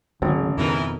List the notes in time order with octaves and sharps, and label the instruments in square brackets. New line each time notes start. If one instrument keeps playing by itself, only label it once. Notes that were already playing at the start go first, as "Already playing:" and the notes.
[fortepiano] G#1 [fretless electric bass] D2 F#3 [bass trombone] C#3
[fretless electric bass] F2 B2 D#3 [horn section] E3 A#4